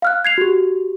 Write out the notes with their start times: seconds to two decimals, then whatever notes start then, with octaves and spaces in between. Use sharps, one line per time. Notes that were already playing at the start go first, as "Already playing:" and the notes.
0.02 F5 F6 F#6
0.25 G#6 C7 F7
0.38 F#4 G4